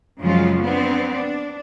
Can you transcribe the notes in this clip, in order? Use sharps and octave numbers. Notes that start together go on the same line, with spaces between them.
F#2 C#3 F3 F#3 G#3 F4
B3 C4 D4
D4